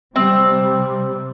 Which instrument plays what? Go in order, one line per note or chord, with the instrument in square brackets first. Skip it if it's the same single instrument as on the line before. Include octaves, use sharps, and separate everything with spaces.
[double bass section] C3 G3 [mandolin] C4